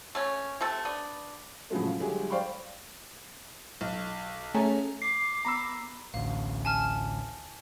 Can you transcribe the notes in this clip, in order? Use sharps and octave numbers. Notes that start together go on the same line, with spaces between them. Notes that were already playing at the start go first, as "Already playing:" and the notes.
A3 C#4
C3 A3 A4
B3 D4
A2 C#3 F3 F#3 G#3 A3
F4
G1 F#3 G#3 G4 G#4
C5 D5 F5 G5 B5 C#6
B1
A3 C#4 G#4 A#5
D6 C7
B3 A#5 B5 E6
A1 D2 F5
G#5 A5 F6